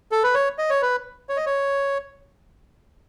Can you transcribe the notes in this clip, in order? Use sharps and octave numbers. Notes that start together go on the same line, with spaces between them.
A4
B4
C#5
D#5
C#5
B4
C#5
D#5
C#5